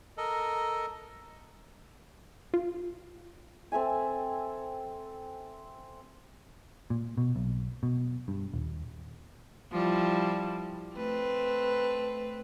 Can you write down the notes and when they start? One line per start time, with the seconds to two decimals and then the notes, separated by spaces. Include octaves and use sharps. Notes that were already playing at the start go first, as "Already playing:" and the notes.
0.18 A4 A#4 D#5
2.54 F4
3.72 C4 A4 E5 G#5
6.90 A#2
7.18 B2
7.36 B1
7.83 B2
8.28 G2
8.54 D#1
9.71 F3 G3 E4
10.95 A3 C4 B4